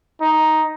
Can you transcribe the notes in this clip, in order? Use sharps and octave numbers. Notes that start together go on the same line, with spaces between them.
D#4